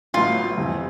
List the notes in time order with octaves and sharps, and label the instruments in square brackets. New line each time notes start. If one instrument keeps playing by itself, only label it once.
[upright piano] A1 A2 F#3 B3 [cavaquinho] F4
[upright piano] F2 C3 E3